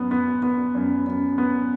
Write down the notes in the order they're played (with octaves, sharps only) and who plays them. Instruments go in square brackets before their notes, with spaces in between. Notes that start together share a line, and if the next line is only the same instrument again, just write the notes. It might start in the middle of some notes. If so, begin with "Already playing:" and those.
Already playing: [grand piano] F#2 B3
B3
B3
F#2
F#2
B3